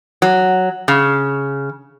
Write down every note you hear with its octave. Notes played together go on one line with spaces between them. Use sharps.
F#3
C#3